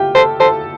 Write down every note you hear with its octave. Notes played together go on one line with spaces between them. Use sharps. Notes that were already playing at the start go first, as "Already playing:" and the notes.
Already playing: F4 G4 G5
A4 C5 A5
A4 C5 A5